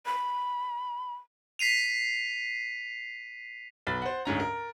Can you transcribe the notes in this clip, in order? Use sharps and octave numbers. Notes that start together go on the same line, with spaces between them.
B5
B6 C7 D#7 F7
B1 B3 B5 A6
C5 F#5
D2 G#2 C#4 A#5
A#4